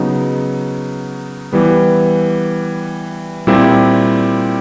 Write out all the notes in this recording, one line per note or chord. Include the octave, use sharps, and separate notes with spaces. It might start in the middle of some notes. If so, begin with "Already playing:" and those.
Already playing: C#3 F#3 B3 D#4
E3 G3 B3
A#2 G3 C4 E4